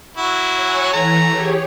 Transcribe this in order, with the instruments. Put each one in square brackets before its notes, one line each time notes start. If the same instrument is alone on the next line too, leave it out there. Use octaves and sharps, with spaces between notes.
[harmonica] F#3 E4 F#4
[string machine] C#5 F#5 G#5
[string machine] E3 [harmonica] A3 A#5
[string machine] G4 G#4 C#5